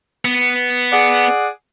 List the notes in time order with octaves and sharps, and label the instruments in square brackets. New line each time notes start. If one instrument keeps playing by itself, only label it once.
[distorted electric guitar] B3
[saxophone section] G#4 D5 F#5